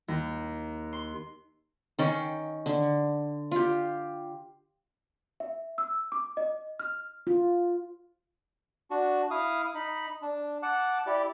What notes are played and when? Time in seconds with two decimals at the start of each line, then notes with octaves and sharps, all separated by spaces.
0.08 D#2
0.93 C6
1.99 D#3 C#4 G5
2.66 D3
3.51 F4 G4
5.40 E5
5.78 E6
6.12 D6
6.37 D#5
6.80 F6
7.27 F4
8.91 D4 F#4
9.31 E4 F5 D#6
9.75 D#4 B5
10.22 D4
10.63 F#5 A5 D6
11.06 E4 G4 D5